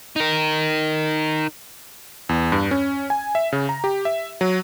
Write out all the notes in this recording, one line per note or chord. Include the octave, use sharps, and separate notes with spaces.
D#4 A#4
E2
G2
C#4
G#5
E5
C#3
A#5
G4
E5
F#3